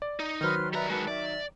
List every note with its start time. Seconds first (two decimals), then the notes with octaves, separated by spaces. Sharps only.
0.02 D5
0.20 D#4
0.41 D#3 F#3 B4 C5 F6
0.73 G3 B4 D5 E5 A#5
0.90 G#3 F#4 B4 A5
1.08 D5 E5